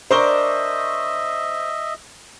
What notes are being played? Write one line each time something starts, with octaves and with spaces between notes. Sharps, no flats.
D4 A#4 C5 D#5 E5 C#6 G7